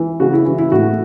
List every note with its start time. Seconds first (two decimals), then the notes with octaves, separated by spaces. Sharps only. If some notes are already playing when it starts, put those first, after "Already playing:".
Already playing: E3
0.20 C#3 F#4
0.33 E4
0.45 E3 E4
0.58 E4
0.72 A2 F#4